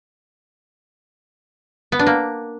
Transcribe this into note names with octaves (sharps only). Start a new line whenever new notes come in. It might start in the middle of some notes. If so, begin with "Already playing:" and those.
B3
D4
A#3